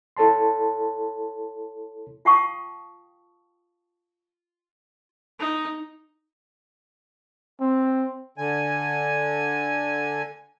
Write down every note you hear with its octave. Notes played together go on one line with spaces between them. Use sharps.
E4 A4 C#5 A5 C6
F4 F5 G5 A5 C#6 D#6
D#4
C4
D3 G#5